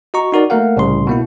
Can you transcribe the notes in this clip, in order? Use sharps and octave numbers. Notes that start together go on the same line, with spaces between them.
F#4 D#5 A#5 C#6
D#4 F#4 A#4 D5
A3 A#3 A#4 F5 F#5
C2 A2 C#3 C6
B2 A#3 E4